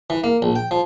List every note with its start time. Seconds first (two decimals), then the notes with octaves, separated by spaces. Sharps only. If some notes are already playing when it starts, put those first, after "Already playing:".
0.10 E3
0.24 A#3
0.42 A#1
0.56 G5
0.71 F3